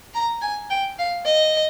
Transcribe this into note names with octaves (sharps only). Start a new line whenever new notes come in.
A#5
G#5
G5
F5
D#5